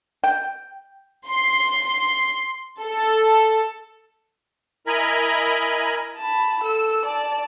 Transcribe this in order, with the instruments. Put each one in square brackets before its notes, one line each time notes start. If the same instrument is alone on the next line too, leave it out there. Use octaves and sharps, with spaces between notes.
[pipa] G5
[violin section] C6
A4
[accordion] E4 A#4 D#5 G#5 A#5 B5
[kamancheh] A5 B5
A4 E6
D5 A5